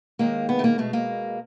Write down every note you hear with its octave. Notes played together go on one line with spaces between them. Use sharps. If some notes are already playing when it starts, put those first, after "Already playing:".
D#2 D#3 G#3 A#3
B3
A3
A#3
B2 G#3 A3
A#3